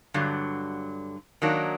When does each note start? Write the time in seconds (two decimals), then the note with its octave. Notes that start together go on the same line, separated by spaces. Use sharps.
0.14 G2 D3 F#3
1.42 D#3 F#3 A#3 D4